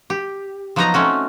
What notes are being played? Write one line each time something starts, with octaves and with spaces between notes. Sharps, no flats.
G4
F3 F#3 B3 D#4 D#5 A#5
A3 C4 C#4 F#4